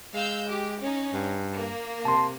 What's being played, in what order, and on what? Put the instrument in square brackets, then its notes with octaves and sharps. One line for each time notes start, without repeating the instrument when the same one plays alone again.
[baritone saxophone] G#3 [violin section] F5 E6 G6
[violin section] G4
C#4 D#4
[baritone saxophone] G2
[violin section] A#3
[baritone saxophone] C3 [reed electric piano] A5 C6